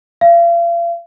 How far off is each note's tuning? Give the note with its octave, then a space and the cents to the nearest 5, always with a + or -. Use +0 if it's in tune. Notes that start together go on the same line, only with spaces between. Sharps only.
F5 -40